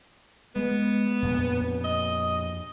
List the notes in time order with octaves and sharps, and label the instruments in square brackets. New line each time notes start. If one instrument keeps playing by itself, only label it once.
[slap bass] G#3 [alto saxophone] B3
[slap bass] F2 A#2
[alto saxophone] D#5